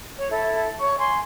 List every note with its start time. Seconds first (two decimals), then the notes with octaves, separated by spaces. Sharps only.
0.17 C#5
0.29 E4 A4
0.78 C#5 C#6
0.97 G#5 C6